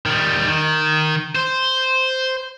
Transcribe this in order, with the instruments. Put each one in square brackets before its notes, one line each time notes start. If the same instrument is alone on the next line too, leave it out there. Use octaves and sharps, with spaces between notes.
[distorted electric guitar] D#3 G3
D#3
C5